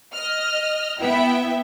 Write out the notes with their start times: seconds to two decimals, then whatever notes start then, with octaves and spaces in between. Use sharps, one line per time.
0.13 D#5 F6
1.00 B3 E4 E5 G5